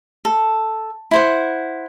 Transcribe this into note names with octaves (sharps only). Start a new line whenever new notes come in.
A4
E4 C5 F#5